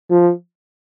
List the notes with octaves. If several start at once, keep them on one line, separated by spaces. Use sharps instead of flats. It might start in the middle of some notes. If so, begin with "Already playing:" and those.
F3